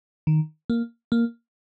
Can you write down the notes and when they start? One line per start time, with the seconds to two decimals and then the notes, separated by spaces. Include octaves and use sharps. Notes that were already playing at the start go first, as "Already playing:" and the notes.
0.27 D#3
0.70 A#3
1.12 A#3